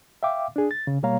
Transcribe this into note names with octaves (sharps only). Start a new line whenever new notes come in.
E5 F5 G5 D6
D4 G#4
A6
C#3
B2 G3 A#3 C#5 F5 A#5